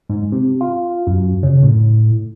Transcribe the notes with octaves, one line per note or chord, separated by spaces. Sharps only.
G#2
C3
F4
F#2
C#3
A2